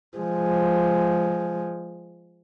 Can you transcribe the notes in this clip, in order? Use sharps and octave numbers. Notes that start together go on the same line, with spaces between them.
F3 G#3